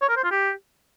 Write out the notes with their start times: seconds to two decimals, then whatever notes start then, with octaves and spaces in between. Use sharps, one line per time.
0.02 C#5
0.09 A#4
0.17 C5
0.24 F4
0.31 G4